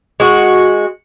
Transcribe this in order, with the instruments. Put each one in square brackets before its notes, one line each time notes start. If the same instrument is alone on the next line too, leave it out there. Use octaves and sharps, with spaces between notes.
[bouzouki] G#3 F#4